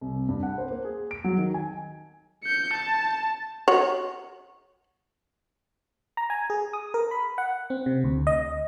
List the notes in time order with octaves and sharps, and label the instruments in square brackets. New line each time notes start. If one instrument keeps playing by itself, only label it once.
[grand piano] C2
G2
F#5
C5
A#3
G#4
D7
F#3
D#3
G#5
[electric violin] G6 C#7
A5
[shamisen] F#4 C#5
[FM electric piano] A#5
G#5
G#4
D#6
A#4
B5
F#5
C4
C3
D2
D#5